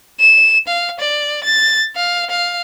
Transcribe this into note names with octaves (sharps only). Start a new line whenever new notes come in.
E7
F5
D5
A6
F5
F5